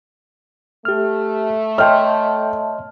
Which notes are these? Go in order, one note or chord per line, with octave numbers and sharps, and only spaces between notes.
A3 G4 F6
C#5 D#5 E5 G5 A5 C6 F6